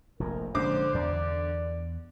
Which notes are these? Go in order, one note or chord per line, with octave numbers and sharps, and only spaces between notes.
F1 A#1 F2 A#4
A#1 D3 G#3 C#4 C5 D6
E2 D5